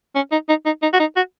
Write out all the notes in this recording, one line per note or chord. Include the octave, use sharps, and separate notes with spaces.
C#4
D#4
D#4
D#4
D#4
F#4
D#4
F#4